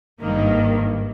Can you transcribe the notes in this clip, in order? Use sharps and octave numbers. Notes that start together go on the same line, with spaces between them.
G#1 G2 D#3 A#3